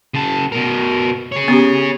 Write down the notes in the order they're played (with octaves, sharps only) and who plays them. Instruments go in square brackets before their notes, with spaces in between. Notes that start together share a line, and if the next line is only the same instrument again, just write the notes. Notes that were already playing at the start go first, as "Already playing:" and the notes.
[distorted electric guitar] C#3 A5
B2 A#4
G#4 C#5
[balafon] B3 C#4 G4